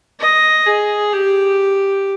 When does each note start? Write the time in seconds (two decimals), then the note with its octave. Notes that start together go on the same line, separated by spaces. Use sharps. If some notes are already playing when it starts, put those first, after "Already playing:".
0.20 D#5
0.66 G#4
1.13 G4